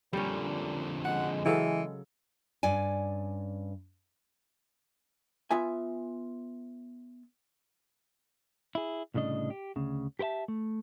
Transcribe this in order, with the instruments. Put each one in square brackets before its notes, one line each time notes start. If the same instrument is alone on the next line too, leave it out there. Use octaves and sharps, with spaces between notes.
[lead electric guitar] F2 D3 [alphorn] A#2 [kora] G3 C#4
[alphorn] G#3 [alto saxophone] F#5
[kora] C#3 F#3 A4 [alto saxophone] E3
[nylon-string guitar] G2 C#4 D5 G#5
[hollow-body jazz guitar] B3 F4 E5 G#5
[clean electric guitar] E4 G#4
C2 A2 C#3 D4 D#5
G4
D2 C#3
G4 A#4 C5 E5 A5
A3